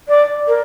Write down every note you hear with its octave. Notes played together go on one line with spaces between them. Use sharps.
D5
A#4